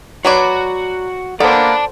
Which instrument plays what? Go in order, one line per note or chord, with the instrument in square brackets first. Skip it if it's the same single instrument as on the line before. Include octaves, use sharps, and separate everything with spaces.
[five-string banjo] F#3 B4 D5 [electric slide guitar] F#4 [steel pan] C#5 F#5 C6
[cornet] A#3 [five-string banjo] B3 [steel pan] A4 C5 [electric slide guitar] D5 A5